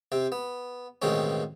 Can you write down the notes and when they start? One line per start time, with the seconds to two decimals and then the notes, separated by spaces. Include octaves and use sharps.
0.12 C3 C4
0.32 B3
1.02 A1 B2 D#3 G#3 C4 C#4